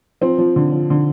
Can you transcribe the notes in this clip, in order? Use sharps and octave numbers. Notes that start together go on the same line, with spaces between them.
F3 C4
F3
D3
F3
D3